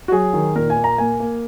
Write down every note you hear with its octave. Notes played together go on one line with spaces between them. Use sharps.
F#4
F#3 G#4
D#3
A#2 A#4
G#5
A#3
A#5
A#3 G#5
A#3